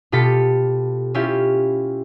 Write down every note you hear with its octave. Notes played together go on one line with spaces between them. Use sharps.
B2 F4 G4 A4 B6
C#4 E4 F4 G4